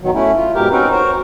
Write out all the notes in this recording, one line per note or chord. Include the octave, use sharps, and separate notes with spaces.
B2 D#3 F#3
A3 C#4 E4
F4
G#2 B2 G4 A#4
C4 C#4 D#4 F#4 A#4 B4
F#4 A#4 C5 C#5